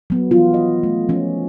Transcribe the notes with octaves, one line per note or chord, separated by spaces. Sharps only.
F#3 B3
E3 F3 B3 F4
D#5
A3
F3 C#4